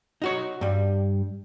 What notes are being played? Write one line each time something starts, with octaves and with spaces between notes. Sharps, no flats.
D#4 F#4 C#5
G2 G3